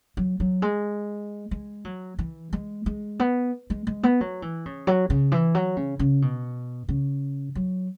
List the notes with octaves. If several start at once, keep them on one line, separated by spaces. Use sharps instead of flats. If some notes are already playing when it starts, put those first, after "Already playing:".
F#3
F#3
G#3
G#3
F#3
E3
G#3
G#3
B3
G#3
G#3
B3
F#3
E3
C#3
F#3
C#3
E3
F#3
C#3
C#3
B2
C#3
F#3